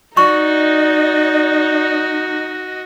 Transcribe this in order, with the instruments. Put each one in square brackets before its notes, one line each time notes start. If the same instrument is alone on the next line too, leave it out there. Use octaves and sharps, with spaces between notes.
[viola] D#4 [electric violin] F#4 D#5 [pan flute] D5 [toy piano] C#6